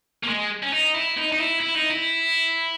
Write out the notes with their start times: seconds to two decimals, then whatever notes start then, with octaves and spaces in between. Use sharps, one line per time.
0.24 A#3
0.28 G#3
0.63 C#4
0.73 D#4
0.94 E4
1.17 D#4
1.32 D#4
1.39 E4
1.60 E4
1.75 D#4
1.90 E4